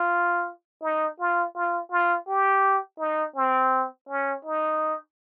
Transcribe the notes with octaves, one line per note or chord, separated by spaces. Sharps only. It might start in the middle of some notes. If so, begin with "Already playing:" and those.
Already playing: F4
D#4
F4
F4
F4
G4
D#4
C4
C#4
D#4